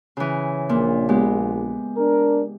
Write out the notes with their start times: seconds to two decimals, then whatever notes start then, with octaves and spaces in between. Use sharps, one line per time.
0.17 C#3 E3
0.69 A#1 A#2
1.09 G#3 B3 G4
1.97 D4 A#4